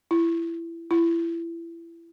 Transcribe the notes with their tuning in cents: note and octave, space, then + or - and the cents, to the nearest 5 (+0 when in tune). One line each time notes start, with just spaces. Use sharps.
E4 +20
E4 +25